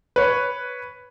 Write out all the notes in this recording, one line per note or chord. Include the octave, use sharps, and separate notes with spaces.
B4 C#5